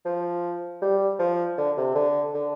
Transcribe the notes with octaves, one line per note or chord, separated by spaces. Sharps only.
F3
G3
F3
D3
C3
D3
D3